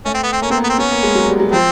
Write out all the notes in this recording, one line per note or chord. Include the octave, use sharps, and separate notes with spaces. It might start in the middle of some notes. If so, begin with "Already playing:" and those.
A3 C#4
C4
B3
C4
A#3 C#4
B3 C4
A#3
B3
C4
B3 C#4
A#3
G#3
F#3
G3
F#3
F3 C4